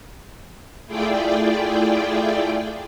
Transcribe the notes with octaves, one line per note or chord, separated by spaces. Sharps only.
A3 E4 F4 G#4 D5 G5